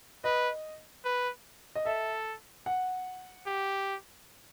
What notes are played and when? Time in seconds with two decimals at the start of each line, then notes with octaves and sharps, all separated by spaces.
0.24 B4 D#5
1.05 B4
1.75 D#5
1.86 A4 E5
2.66 F#5
3.46 G4